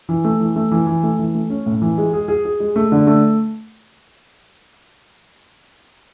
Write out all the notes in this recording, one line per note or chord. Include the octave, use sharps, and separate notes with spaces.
E3
A3
E3
A3
E3
E3
A3
E3
A3
C#4
A2
E3
G#3
G#4
G#4
G#4
G#3
A3
D3
A3